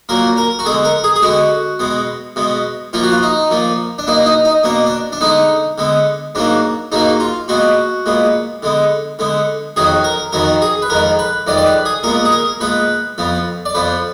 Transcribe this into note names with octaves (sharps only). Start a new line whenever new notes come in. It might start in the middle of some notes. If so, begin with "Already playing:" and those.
A#2 F#3 A#3 A#4
A#4
F#4
D3 G#3 B3 G#4
A#4
G#4
G#4
D3 G#3 B3 F#4
B2 G#3 B3
B2 G#3 B3
A#2 F3 A#3 F4
F#4
F4
D#4
A#2 F3 A#3
D4
B2 A#3 D#4
D#4
D#4
B2 A#3 D4
D4
D4
D3 G#3 B3 D#4
D3 G#3 B3
G#2 F#3 A#3 D4
G#2 F#3 A#3 D#4
F4
A#2 G#3 B3 F#4
A#2 G#3 B3
D3 G#3 B3
D3 G#3 B3
F2 D#3 F#3 B3 G#4
A#4
F2 D#3 F#3 B3 A#4
G#4
B4
F2 D#3 G#3 A#4
B4
F2 D#3 G#3 D5
D5
B4
G#4
A#2 G#3 B3 A#4
G#4
A#4
A#2 G#3 B3 B4
F2 F3 B3
D5
F2 F3 B3 B4